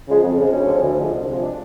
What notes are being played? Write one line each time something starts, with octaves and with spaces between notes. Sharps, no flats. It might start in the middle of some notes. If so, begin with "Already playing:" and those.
C#3 F3 G#3
F2
C#3 F3 G#3
D2 C#4
D3 F3 G#3
D2
D3 F3 G#3
C2
C3 F3 G#3
D4